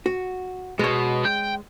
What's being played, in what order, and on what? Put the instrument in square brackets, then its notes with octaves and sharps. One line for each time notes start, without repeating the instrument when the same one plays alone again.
[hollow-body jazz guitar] F#4
[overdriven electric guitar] B2 [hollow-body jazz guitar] G#3 C#5
[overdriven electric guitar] G5